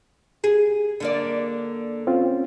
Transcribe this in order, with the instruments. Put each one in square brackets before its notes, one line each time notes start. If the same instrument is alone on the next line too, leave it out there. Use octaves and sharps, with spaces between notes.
[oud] G#4
D3 A#3 D5
[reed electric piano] C4 C#4 F4